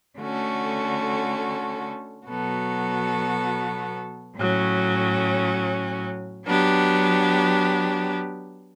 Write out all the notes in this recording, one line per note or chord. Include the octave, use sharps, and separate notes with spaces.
D3 A3 C#4 F#4 A4
B2 F#3 B3 F#4 A4
A2 F#3 C#4
F#3 B3 D4 G4